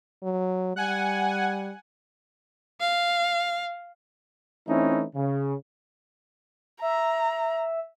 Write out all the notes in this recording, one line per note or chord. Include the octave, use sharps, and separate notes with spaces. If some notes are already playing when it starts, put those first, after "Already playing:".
F#3
G3 F#5 G#5
F5
E3 A3 C4 C#4 D#4 E4
C#3
E5 A#5